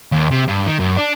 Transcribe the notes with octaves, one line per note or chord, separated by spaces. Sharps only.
D#2
C3
G2
D#3
F#2
D4